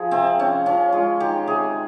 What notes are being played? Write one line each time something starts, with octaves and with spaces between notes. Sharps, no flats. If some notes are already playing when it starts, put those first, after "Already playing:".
Already playing: F3 G#4
C3 C4
F3 C#4
F3 C#4
G#3 F4
D#3 G4
C3 G#4